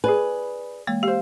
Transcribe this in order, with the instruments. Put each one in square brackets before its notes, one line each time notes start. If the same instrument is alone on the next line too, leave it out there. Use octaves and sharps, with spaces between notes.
[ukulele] G#4 D5 G#5 [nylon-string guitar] B4
[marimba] E3 G#3 A#3
[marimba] G4 [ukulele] C5 F5